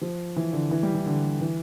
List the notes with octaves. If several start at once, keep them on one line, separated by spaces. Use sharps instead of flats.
F3
E3
D3
E3
G3
E3
D3
E3